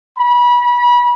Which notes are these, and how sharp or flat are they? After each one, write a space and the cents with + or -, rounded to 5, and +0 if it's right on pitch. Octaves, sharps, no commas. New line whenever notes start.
B5 -30